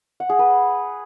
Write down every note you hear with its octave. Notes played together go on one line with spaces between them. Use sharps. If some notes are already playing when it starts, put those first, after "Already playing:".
F#5
G#4
B4